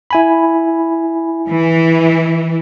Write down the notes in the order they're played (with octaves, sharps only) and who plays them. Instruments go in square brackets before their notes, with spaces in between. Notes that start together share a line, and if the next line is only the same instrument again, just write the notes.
[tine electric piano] E4 G#5 B5
[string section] E3